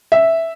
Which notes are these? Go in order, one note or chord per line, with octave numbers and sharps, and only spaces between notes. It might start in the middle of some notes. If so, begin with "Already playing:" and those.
E5